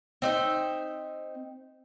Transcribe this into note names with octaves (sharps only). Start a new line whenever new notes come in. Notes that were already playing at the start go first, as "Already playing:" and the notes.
C4 D#4 E5